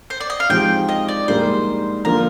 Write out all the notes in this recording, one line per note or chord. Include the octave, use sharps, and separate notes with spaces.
C5
D5
D#5
F5
G#2 F3 C4 G4 G5
D#5
D5
A#1 G#2 G3 A#3 C5
D3 F3 A#3 A#4